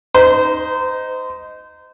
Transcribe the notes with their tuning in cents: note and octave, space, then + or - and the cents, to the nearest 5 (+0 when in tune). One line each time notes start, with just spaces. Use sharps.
D#4 +0 C5 -30